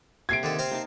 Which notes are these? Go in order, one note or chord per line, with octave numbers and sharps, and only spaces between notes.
C3 A#3 E5 G#6 C7 D7
D3 D#3 A4
C4 C5 F5
A#3 D#4 A5